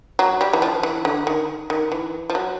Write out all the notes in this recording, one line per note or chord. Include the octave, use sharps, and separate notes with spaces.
F#3
G3
E3
F3
E3
D3
D#3
D#3
E3
F3
F#3